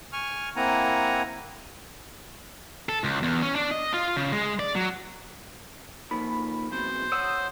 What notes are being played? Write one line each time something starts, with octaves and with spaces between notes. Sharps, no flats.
G#5 C#6 F6
A#3 C4 E4 F#5 G#5 A#5
A4
C#2
E2
C#4
D4
D#5
F4
C#3
G#3
D5
F#3
A#2 D#3 F3 B5
F2 G#2 B2 C5
C#5 F#5 D#6 E6